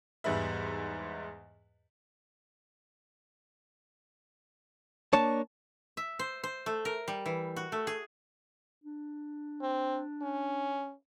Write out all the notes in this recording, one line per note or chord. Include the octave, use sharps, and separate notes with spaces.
E2 G#2 G3 G#3 B4 E5
A#3 D4 C#5 A5
E5
C5
C5
A3
A#4
G3
E3
F#4
A3
G#4
D4
C4
C#4